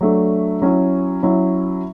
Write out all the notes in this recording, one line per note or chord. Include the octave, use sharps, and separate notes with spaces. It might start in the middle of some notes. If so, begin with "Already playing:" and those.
F#3 A3 D4
F#3 C#4 E4
F#3 C#4 E4